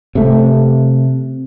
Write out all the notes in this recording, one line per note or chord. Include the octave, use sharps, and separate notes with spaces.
C3 A3